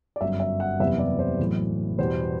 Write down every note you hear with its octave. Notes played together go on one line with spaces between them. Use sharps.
D5
G1 F#2 F#3 E5
E5
F#5
F#1 E2 C3 G3 B3 E5
D5
C5
B1 A2 E3
E2 B2 G3 B3 C5